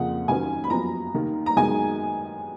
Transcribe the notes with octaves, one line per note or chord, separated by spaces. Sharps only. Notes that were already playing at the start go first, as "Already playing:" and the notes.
Already playing: F2 C#3 F3 A#3 F#5
D#2 D#3 F#3 A#3 C#4 G#5
B5
F#2 F3 B3 A#5
D#2 D#3 A#3
A#5
F#2 D#3 G#3 B3 G#5